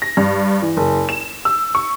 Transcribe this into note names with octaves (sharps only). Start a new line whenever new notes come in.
A#6
G2
E3
F#1
E7
E6
C#6